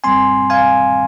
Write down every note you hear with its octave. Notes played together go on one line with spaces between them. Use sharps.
G2 G3 C4 G#5 C6
F5 G#5